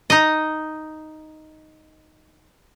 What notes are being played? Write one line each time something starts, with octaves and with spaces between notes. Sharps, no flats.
D#4 D#5